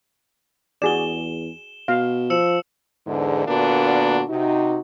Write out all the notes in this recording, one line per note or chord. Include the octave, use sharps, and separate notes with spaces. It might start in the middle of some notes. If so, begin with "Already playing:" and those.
E2 F#4 G#4 D5 E7 G7
B2 F5
F3 E6 C#7 E7
E2 G#2 D3
A#2 D3 A#3 B3 D4 F#4
C3 D#4 F#4